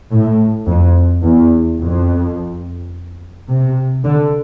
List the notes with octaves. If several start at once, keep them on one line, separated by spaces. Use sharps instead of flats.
A2
F2
E2
F2
C3
D3